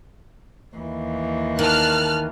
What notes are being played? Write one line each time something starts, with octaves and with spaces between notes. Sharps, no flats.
D#2 E3
D#3 A5 F6 F#6